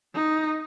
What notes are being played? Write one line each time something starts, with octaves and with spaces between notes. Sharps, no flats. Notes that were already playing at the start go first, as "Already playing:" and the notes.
D#4